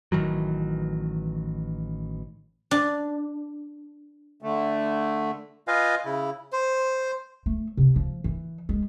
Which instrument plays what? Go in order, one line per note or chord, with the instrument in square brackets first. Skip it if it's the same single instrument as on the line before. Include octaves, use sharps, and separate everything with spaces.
[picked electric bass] A1 D#3 E3 F#3
[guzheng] D4
[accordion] D3 A3
[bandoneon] F4 B4 D#5 F5 G#5
C#3 E4
[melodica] C5
[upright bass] A3
C3
F3
E3
G#3